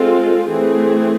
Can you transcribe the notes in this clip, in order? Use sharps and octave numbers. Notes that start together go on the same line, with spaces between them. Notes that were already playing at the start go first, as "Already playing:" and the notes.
Already playing: G#3 C4 F4 A4
E3 A3 C4 G#4